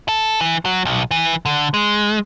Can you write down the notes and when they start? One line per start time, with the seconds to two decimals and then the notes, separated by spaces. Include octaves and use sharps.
0.09 A4
0.41 E3
0.65 F#3
0.85 B1
1.11 E3
1.45 D3
1.74 G#3